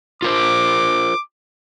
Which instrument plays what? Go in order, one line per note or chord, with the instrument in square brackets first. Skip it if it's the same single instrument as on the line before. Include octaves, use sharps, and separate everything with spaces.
[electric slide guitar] F4 A#4 C5 [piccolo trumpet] D6